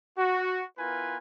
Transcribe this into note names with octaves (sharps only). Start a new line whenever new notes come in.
F#4
B3 E4 F4 A#4 B4 G#5